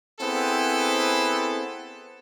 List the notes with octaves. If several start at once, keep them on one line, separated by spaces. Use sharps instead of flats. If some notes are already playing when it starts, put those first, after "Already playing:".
B3 C4 E4 G#4 A4 B4